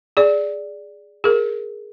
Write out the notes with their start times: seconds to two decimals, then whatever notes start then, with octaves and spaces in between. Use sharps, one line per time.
0.17 G#4 D5
1.24 G#4 A#4